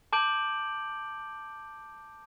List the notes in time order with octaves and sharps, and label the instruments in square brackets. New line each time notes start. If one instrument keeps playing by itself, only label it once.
[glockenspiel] A5 D6 G6 D7 F#7